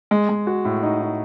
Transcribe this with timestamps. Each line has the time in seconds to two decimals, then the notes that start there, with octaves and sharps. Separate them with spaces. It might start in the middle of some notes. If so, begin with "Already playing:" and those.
0.11 G#3
0.29 G#3
0.47 F#4
0.65 A2
0.83 D#4
1.01 D#4